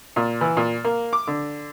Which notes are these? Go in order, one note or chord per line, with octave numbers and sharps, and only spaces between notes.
A#2
E3
A#2
A#3
D6
D3